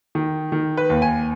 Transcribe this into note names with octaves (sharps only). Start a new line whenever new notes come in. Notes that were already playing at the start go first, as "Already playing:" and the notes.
D#3
D#3
B4
D#2
G#5